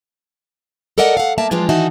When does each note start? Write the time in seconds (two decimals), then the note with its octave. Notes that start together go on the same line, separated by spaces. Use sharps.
0.98 A4 A#4 D5 D#5 F#5
1.17 F5 F#5
1.38 A#3 E5 A5
1.51 E3 F3 G#3 D4 F4 G4
1.69 D#3 E3 D#4 F#4 E5 A5